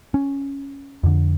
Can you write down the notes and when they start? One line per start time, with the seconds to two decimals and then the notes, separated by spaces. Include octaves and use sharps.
0.14 C#4
1.03 F2 D3